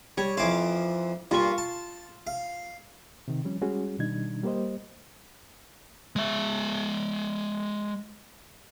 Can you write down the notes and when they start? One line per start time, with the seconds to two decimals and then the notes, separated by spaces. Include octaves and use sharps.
0.17 G3 C#5
0.37 F2 E3 C5 F5 D6
1.31 G2 A#2 F4 C#6
1.58 A5
2.27 F5
3.28 C3 D#3
3.44 F3 G3 C#4
3.61 G3 G#3 C#4 F#4 G#4
3.99 B2 D#3 G3 D4 D#4 G#6
4.43 G3 A#3 G4 C5 D#5
6.16 G#3 E5